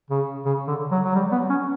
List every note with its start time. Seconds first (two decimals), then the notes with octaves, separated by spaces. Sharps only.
0.10 C#3
0.46 C#3
0.68 D3
0.91 F#3
1.04 F#3
1.15 G3
1.32 B3
1.50 C#4